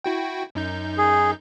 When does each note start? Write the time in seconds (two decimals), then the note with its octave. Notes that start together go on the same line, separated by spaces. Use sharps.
0.04 E4 F#4 G5
0.55 F#2 D#4 G6
0.98 G#4